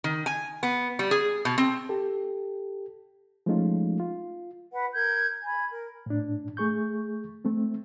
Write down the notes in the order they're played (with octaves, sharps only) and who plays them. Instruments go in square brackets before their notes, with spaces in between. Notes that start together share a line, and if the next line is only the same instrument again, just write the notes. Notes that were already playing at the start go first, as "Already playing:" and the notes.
[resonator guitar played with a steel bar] D#3
G#5
B3
G3
G#4
B2
C4
[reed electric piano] G4 A4
F3 G#3 A3 C#4 D#4 F4
F4
[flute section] B4 F#5
A#4 G6 G#6
G#5 B5 G#6
A#4
[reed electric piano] A2 D4
A3 G#4 C#6 G6
A3 C4